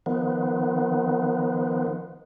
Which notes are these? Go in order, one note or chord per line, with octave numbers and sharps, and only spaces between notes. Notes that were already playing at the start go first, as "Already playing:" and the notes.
D#3 F3 B3